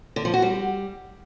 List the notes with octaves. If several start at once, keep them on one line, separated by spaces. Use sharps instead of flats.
D3
F3
F#4
G3